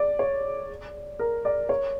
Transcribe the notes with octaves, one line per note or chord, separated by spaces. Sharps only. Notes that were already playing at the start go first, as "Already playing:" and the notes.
Already playing: D5
C#5
A#4
D5
C#5